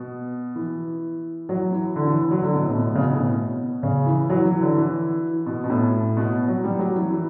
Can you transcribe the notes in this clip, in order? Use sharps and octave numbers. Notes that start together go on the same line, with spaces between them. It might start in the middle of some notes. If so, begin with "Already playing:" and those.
Already playing: B2
E3
F#3
E3
D3
E3
F#3
D3
B2
A2
B2
C#3
B2
A2
B2
C#3
E3
F#3
E3
D3
E3
B2
B2
A2
B2
F#3
G3
F#3
E3
E3